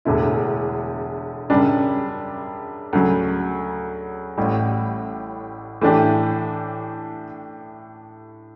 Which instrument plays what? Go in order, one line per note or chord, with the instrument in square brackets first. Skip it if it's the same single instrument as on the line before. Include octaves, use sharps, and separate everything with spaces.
[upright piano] E1 E2 D3 A3 E4
F#2 C#3 G3 D4
D2 C#3 F#3
A1 A2 G3
A2 E3 A3 D4 G4